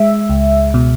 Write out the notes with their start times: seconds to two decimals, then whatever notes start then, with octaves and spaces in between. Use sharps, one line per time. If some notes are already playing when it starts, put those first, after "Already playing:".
Already playing: G#3 E5
0.29 C#2
0.74 B2